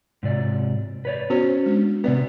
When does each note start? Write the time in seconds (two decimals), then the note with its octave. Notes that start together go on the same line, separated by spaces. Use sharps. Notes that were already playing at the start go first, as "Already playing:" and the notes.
0.23 G#2 C3 D5
1.05 B4 C#5 D5
1.30 B3 C#4 F#4 C5
1.66 G#3 D4
2.04 C3 B3 B4 D5